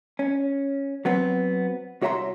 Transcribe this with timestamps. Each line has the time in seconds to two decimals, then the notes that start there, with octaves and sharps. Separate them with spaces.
0.19 C#4
1.05 F#3 B3 C4
2.02 C2 F#4 C#5 E5 A#5 C6